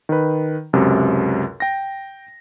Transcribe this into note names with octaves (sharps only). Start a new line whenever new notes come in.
D#3 B4
C#2 F#2 C3
G5 A#6